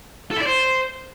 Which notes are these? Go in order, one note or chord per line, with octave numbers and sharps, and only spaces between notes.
A4
E4
D5
C5